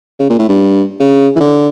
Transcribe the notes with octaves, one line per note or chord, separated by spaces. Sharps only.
C#3
A#2
A2
G2
C#3
E3
D3